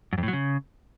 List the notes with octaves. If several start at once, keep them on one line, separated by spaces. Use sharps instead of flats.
F#2
F2
A2
F#3
C#3